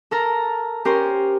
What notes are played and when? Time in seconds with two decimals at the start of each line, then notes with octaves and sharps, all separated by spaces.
0.11 A4 A#4 A#5
0.85 C#4 G4 A#4 C5